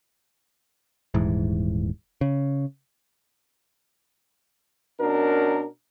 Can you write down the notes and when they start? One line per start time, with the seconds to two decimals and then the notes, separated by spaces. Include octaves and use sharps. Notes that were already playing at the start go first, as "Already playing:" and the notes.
1.14 D#1 G#2 E3
2.21 C#3
5.00 B2 C#4 D4 A#4